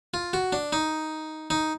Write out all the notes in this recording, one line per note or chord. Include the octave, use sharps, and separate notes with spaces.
F4
F#4
D4
D#4
D#4